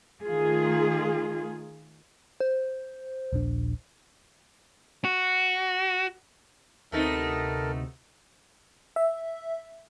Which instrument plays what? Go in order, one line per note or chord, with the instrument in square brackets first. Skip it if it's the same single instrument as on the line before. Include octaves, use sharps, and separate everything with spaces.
[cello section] D#3 A3 F4 G#4
[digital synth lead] C5
[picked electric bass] D#1 A#1 D4
[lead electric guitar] F#4
[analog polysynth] D2 C3 [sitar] A3 B3 D#4 [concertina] A4 A#4
[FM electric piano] E5